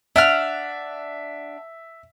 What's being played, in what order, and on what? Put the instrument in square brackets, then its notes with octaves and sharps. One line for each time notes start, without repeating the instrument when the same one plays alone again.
[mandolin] D4 F#5 F6 [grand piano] E5